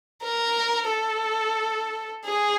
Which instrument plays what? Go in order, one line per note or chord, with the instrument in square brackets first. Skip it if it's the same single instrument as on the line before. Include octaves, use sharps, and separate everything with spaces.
[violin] A#4
A4
G#4